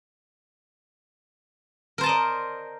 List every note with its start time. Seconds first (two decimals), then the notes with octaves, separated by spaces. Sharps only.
1.98 A#4
2.01 C5
2.03 A5
2.06 D#5
2.09 D5